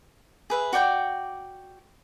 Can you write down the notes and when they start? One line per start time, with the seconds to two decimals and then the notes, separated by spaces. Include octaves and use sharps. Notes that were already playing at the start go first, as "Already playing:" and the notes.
0.50 G#4 B4 E5
0.73 F#4 D5 G5 D6